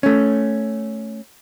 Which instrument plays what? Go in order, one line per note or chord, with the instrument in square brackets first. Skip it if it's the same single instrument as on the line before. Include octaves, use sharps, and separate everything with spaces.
[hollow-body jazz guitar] A3 C#4